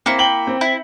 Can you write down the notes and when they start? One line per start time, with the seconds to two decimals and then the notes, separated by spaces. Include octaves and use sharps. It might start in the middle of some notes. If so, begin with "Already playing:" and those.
0.06 A#3 C4 E4 C#7
0.19 G5 F#7 G7
0.47 C4
0.61 E4